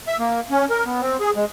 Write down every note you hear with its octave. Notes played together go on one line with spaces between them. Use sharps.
E5
A#3
C#4
A#4
B3
C4
G#4
G#3